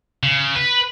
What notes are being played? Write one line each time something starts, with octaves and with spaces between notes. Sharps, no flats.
C#3
B4